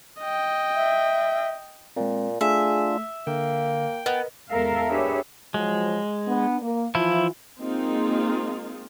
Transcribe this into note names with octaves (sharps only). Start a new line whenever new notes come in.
D#5 G5
E5
A#2 G#3 C4
A3 D4 F4 G#4 E5
D3 A#3 F5 G5
B3 A#4 B4 D#5
E2 G#3 A4 A#4 E5 F5
D4 G4 G#4 B4 C#5 E5
F3 F#3 G#3
B3 D4
A#3
E3 F3 E4 F4
G#3 A#3 C4 D#4 F4 G#4